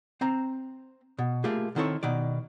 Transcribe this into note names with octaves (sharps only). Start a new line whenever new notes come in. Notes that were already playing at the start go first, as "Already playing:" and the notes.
C4 C5 A#5
B2
A3 A#3 F4 G4 G#4
D#3 C4 E4 A4 B4 C#5
B2 D#3 D5